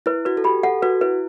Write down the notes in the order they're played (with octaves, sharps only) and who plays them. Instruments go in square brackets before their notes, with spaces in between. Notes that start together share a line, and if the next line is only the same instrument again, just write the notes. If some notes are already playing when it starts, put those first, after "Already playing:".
[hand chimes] E4 [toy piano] B4
[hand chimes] F#4 [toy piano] B4
[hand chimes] A4
[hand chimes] G4 [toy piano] B5
[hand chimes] A4 [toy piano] F#5
[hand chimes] F#4 [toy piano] B4
[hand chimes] E4 [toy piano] B4